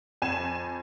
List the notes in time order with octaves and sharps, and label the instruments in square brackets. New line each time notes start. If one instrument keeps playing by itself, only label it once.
[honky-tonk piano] F2 G#5 E7